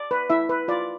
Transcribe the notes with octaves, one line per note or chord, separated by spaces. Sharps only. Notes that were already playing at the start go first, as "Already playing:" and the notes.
Already playing: D5
B4
E4 E5
B4
F4 D5